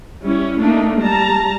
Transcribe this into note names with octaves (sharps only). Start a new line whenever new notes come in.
G3 C#4 E4
A3 A#3 D4 D#4
G3 A5 A#5